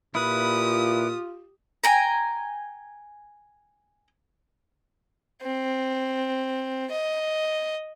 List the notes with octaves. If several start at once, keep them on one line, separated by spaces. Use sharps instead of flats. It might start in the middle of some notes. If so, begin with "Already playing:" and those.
A#2 E4 F4 G4 B4 D#6
G5 G#5 A#5
C4
D#5